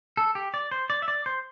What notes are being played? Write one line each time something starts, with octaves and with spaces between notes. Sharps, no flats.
A4
G4
D5
C5
D5
E5
D5
C5